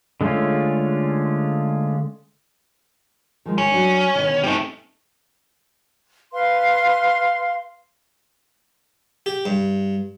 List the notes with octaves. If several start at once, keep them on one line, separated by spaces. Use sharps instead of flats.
D3 G#3 A3 C#4 F4
D#3 F3 G#3
D#3 C#4
F#3 D4
B2 D3 D#3
G3 A3 C4 C#4 D#4
B4 F5 C6
G4
G2